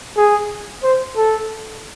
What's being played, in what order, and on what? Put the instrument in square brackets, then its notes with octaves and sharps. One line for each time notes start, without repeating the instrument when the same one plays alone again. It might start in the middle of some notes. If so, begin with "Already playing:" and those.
[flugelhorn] G#4
C5
A4